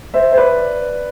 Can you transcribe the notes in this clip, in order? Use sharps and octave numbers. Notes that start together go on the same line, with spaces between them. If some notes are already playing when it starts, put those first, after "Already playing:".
C5 E5
C5
B4 D5